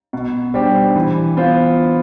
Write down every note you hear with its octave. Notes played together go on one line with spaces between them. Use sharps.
B2
G3 D4 G4 C5
E3
B3 F4 C5